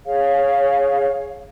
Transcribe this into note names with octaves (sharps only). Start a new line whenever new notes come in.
G#4 C#5 F5